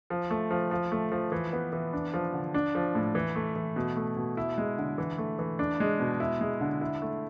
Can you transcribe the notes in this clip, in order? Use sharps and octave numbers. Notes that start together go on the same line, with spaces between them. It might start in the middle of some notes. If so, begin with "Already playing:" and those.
F3
A3
F3
F3
A3
F3
E3
B3
E3
D4
F3
D3
D4
F3
A2
E3
A3
E3
B2
A3
B2
E4
G#3
D3
E3
A3
E3
D4
G#3
B2
E4
G#3
D3
E4
A3